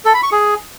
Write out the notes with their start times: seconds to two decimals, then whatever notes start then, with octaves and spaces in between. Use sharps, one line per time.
0.05 A4
0.14 B5
0.23 C#6
0.32 G#4